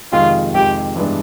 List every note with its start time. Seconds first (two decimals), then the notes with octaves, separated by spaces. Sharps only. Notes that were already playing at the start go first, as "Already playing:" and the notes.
0.12 F2 C3 D#3 G#3 F4
0.54 F2 C3 D#3 G#3 G4
0.96 G2 E3 G#3 B3 D4